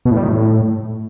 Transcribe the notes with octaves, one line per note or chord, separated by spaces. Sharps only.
B2
A2
G3
D#3
A2